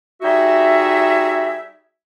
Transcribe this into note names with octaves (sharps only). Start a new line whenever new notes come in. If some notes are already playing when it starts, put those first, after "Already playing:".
G3 D#4 F#4 G#4 E5